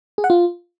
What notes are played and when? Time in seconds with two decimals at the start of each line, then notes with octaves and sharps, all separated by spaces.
0.18 G#4
0.24 F#5
0.30 F4